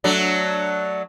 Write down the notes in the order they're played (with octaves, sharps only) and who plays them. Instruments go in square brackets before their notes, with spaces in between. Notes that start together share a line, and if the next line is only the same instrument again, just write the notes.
[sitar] F#3 A3 D4